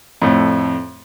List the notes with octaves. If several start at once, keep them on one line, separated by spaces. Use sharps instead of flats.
F2 A2